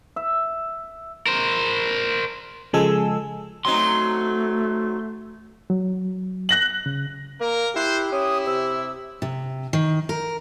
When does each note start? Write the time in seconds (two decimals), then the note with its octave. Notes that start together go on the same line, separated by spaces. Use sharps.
0.16 E5
1.26 A#4 C5
2.73 C#3 F3 G#3 A4 G#5 E6
3.65 F#3 A3 C4 D#4 C6
5.70 F#3
6.49 F#6 A#6 F#7
6.86 C#3
7.41 A#3 A#4
7.76 E4 G4 C5 F#6
8.12 C#4 E4 D#6
8.47 C3 E6
9.22 C3
9.73 D#3
10.09 A#4